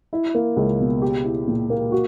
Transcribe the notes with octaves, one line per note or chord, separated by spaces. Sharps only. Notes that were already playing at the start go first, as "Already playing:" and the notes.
E4
A#3
C#2
B2
G4
E4
A#2
A#3
F#4